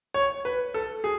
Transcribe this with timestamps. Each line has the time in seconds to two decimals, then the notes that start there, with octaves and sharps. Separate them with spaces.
0.14 C#5
0.45 B4
0.74 A4
1.04 G#4